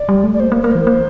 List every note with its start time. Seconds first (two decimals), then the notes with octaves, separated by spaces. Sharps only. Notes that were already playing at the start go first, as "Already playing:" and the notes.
Already playing: D5
0.09 G3
0.24 A3
0.33 D5
0.40 A#3 C5
0.52 A#3
0.62 A#3 A#4
0.71 E3 C5
0.87 A#3